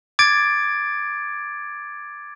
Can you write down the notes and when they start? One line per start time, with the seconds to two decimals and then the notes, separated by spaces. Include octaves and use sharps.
0.19 D6 G#6 A6 D7